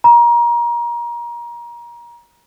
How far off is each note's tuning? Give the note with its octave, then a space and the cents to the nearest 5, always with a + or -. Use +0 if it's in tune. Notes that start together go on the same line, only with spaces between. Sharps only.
A#5 +30